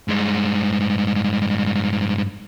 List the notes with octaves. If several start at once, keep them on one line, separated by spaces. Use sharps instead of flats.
G2 G#3